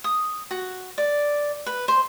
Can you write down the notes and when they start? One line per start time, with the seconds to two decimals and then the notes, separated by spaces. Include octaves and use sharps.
0.04 D#6
0.51 F#4
0.98 D5
1.66 B4
1.88 C5